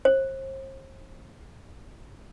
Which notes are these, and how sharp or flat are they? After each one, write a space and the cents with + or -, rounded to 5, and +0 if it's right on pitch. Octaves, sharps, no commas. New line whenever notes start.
C5 +40